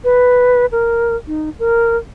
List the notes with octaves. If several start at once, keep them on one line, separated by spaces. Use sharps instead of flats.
B4
A#4
D#4
A#4